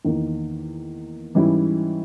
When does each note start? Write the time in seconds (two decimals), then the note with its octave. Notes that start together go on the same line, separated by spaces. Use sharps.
0.05 E2 D#3 A#3
1.35 G#2 E3 G3 C#4 E4